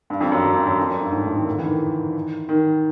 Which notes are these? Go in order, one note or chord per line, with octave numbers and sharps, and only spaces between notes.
G2
F2
F#2
F#2
G2
F#2
F2
F#2
G2
G#2
A2
D#3
D3
E3
D#3
D#3